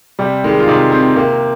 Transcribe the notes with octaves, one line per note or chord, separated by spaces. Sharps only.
C3 G3
D#3 G#3
F4
C3 D#4
D#3 C4
C3 A#3